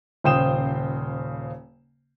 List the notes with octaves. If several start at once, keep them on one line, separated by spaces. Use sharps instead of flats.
D#1 C#3 C5 G5 D#6 E7